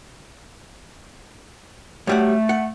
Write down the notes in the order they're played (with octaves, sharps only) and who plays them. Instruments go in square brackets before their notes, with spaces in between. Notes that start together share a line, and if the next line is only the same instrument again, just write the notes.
[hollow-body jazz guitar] F#2 G3 F#5 [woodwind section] A3
[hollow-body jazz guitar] F#5